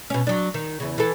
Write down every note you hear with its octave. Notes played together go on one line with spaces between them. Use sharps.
B2 C#4
F#3 D4
D#3
E2 C#3
E3 A4